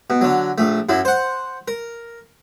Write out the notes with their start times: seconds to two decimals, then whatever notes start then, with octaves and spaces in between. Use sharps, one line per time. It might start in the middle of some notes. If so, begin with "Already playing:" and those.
0.10 B2
0.21 D3 F#3
0.58 A#1 A3
0.89 F#2 F#3 E4
1.05 C5 F#5
1.68 A#4